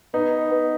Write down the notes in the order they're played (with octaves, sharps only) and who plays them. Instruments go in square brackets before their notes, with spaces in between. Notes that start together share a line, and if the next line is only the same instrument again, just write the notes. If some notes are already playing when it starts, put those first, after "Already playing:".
[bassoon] B3 [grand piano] D#4
[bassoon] B3